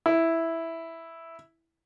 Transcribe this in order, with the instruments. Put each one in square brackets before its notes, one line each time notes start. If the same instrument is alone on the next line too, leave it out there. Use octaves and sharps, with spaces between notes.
[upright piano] E4